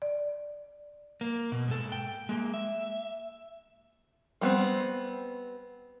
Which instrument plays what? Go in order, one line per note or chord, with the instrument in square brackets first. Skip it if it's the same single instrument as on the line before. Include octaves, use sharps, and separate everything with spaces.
[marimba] D5
[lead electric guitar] A#3
B2
G#2 A4
G5
G#3 A#3
E5
[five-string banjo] G3 B3 C4